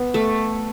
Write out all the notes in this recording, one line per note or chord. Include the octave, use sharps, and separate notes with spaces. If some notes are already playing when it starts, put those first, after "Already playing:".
Already playing: B3
A3